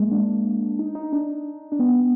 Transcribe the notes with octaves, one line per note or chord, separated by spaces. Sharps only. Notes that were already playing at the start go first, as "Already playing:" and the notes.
Already playing: G#3 A#3
D4
D#4
D#4
D4
D4
B3